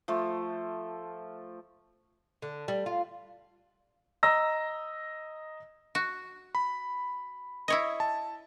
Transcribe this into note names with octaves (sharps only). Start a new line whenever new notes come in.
F3 A3
D3
G3
F4
D#5 A#5 E6 A#6
F#4
B5
E4 C#5 D#5
A5